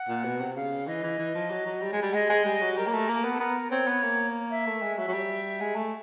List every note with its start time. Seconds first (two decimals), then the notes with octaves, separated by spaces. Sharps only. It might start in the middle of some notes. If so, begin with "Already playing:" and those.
Already playing: F#5
0.09 A#2
0.24 B2
0.40 C3
0.56 C#3 F5
0.87 E3 D#5
1.03 E3
1.19 E3
1.35 F3
1.51 F#3
1.66 F#3
1.82 G3
1.93 G#3
2.02 G3
2.13 G#3 D#5
2.29 G#3
2.45 G3
2.61 F#3
2.77 G3 A#4
2.87 A#3
2.93 A3
3.08 A#3
3.24 B3
3.33 A4
3.40 B3 A#4
3.71 C4 C#5
3.87 B3
4.03 A#3
4.51 E5
4.66 A3
4.82 G#3
4.98 F#3 E5
5.08 F#3
5.13 G3
5.60 G#3
5.76 A3